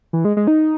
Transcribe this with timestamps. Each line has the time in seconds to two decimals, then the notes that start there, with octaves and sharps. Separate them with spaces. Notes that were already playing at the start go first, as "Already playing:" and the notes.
0.13 E3
0.25 G#3
0.37 G#3
0.47 D#4